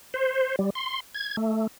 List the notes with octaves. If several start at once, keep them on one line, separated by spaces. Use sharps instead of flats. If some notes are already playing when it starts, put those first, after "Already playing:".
C5
G3
C6
G#6
A3